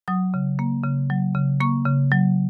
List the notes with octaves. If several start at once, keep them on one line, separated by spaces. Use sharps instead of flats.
F#3 D#6
C#3
A#3
C#3
F#3
C#3
A#3 C#6
C#3
F#3